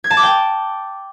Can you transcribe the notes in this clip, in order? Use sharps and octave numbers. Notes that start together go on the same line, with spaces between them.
G#6
A5
D6
G5